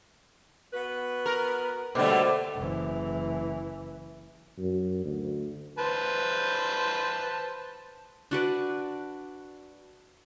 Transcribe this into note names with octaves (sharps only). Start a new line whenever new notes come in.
B3 F#4 B4
A#4
B2 D3 G3 A3 A#3 A4 C5 D6
F#1 E3
F#2
D2
B4 C5 A5
D4 F#4 B4 D5